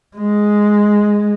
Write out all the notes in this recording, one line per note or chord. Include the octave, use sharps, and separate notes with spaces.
G#3